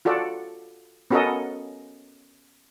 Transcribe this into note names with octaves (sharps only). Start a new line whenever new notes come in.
F4 F#4 A4 D5
B3 C#4 F#4 A4 A#4 D#5